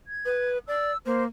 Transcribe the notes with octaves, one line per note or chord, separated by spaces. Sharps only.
G#6
B4
D5 E6
A#3 C5